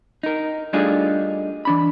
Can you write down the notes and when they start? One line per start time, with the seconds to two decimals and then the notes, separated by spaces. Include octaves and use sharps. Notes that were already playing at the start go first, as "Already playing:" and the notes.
0.23 D#4 A#4
0.73 G3 A3 D4 D#4 F4 G#4
1.65 E3 D4 B5